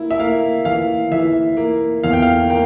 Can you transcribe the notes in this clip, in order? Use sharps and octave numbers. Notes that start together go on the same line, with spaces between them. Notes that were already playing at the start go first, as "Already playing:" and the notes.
Already playing: A#3 E4
E5
A#3 F5
E3 F5
E3 E5
A#3
E2 F5
G5
F5
A#3 G5